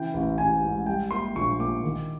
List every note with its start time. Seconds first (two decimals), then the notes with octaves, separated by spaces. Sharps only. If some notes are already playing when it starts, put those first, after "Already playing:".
Already playing: C#3 E3 G5
0.14 A1
0.38 A1 G#5
0.63 G#2
0.86 G3 G5
1.11 A#3 C6
1.36 A#1 C#6
1.59 A#2 D6
1.84 D#3